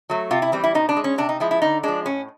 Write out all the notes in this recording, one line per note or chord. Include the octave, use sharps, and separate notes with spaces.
F#3 A3
C3 F4
E4
E3 G3 C4
E4
B2 D#4
D4
G#3
C#4
C3 D4
D#4
F3 G#3 E4
E4
D3 D#4
F3 G#3 D4
A2 C#4